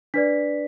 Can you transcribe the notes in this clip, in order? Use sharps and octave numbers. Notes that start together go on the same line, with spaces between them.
D4 B4 D5 B6